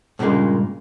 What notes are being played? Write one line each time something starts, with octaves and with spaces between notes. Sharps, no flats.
G2 A#2 C#3 G#3 A#3